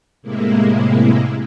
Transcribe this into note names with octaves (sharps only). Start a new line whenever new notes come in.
A2 C3 G#3 A#3 E4